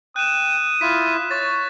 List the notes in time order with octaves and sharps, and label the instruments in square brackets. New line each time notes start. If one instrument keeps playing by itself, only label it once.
[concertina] G5 [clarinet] D#6 [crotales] F#6 E7
[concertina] E4 F4 [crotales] B6
[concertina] C#5 [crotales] C#6 A6